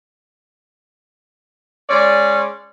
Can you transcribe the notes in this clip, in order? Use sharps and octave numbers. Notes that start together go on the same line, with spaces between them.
G#3 C#4 D5